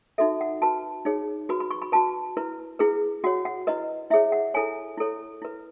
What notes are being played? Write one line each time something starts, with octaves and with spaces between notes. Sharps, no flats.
D#4 F#4 A4 E5
F#5
F#4 B4 A5
D#4 G#4 C#5
F#4 B4 B5
B5
C#6
B5
F#4 B4 A5
E4 B4
E4 G#4 B4
F#4 C#5 F#5
F#5
E4 B4 D#5
E4 G#4 C#5 E5
F#5
E4 A4 C#5 G#5
E4 A4 C#5
E4 B4